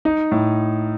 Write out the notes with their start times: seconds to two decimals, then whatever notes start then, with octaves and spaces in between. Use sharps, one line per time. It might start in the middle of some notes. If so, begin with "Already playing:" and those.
0.05 D#4
0.32 A2